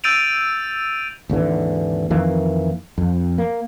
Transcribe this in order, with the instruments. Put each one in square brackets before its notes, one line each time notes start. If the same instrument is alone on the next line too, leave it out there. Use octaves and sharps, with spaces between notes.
[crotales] E6 G6 A6 D7 D#7 F7
[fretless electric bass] G#1 D#2 D3 E3
F2 D#3 E3 A#3
F2
A#3